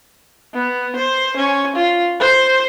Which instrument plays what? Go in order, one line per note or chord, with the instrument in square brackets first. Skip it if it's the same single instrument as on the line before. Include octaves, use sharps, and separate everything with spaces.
[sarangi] B3
C5
C#4
F4
C5